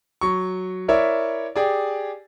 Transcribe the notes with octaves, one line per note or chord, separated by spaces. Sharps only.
F#3 C#6
E4 A#4 C#5 D5 E5
G4 G#4 D5